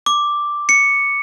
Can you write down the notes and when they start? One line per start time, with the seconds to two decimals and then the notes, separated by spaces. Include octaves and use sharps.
0.06 D6
0.69 C#7